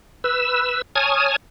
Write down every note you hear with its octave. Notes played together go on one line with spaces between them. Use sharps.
B4 E6
C#5 G#5 A5 D#6 F6 G#6